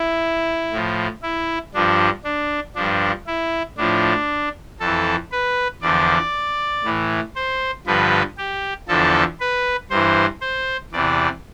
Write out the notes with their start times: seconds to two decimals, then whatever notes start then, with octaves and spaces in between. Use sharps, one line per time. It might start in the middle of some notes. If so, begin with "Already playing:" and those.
Already playing: E4
0.72 A2 F3
1.22 E4
1.74 G2 F3 D4
2.24 D4
2.75 G2 F3 D4
3.27 E4
3.77 A2 F3 D4
4.80 F2 E3 A4
5.32 B4
5.82 E2 D3 F3 D5
6.84 A2 E3
7.36 C5
7.86 G2 D3 F3 B4
8.38 G4
8.88 E2 D3 F3 A4
9.40 B4
9.90 G2 E3 C5
10.41 C5
10.92 E2 C3 E3 D5